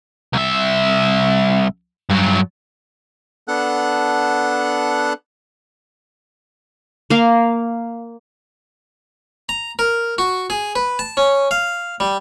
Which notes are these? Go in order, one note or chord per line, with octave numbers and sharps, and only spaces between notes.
C2 E5
G2 F#3
B3 D4 A4 F#5 F#6
A#3 F5
A#5
A#4
F#4
G#4
B4
A5
C#4
F5
G3